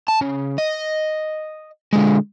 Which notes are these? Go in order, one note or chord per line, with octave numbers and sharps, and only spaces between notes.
A5
C#3
D#5
D3 G#3